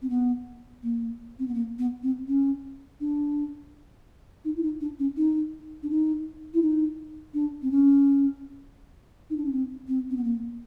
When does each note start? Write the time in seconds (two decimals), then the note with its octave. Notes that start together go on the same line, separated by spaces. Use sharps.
0.02 C4
0.09 B3
0.83 A#3
1.38 C4
1.47 B3
1.54 A#3
1.78 B3
2.03 C4
2.28 C#4
3.00 D4
4.44 D#4
4.56 E4
4.62 D#4
4.80 D4
4.99 C#4
5.17 D#4
5.82 D4
5.90 D#4
6.53 E4
6.61 D#4
7.34 D4
7.62 C4
7.71 C#4
9.30 D#4
9.37 D4
9.45 C#4
9.52 C4
9.88 C4
10.10 C4
10.16 B3
10.23 A#3